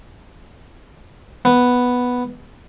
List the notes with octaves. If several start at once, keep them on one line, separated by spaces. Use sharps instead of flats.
B3